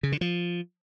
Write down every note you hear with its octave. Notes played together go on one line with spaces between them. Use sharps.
C#3
D3
F3